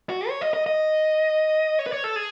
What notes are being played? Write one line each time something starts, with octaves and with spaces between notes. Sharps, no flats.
F#4
C#5
D#5
D#5
D#5
C#5
B4
C#5
A4
G#4